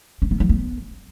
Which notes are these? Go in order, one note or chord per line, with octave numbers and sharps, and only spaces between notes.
C#4
B3
F3
B3